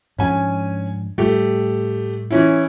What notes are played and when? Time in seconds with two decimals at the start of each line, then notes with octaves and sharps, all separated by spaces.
0.18 G#2 F3 C#4 D4 G#5
1.18 A2 G3 A3 G4
2.31 E3 C#4 E4